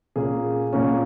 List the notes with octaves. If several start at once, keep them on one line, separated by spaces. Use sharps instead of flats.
A#2 A#3 C#4 G#4
A#2 A#3 C#4